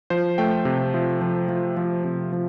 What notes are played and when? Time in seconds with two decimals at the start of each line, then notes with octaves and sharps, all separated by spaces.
0.10 F3 C5
0.38 A3 G5
0.65 C3
0.94 F3
1.21 F3
1.49 F3
1.77 F3
2.04 C3
2.33 F3